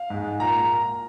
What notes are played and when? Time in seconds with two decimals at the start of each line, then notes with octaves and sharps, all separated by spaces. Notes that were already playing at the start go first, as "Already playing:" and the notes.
Already playing: F5
0.10 G#2 G#3
0.40 A#2 A#3 A#5
0.57 A#5